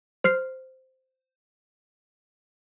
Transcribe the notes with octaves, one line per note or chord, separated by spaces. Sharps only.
C5 F6 C7